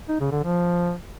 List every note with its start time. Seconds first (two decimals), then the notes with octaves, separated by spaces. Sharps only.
0.09 D#4
0.20 C#3
0.32 D3
0.43 F3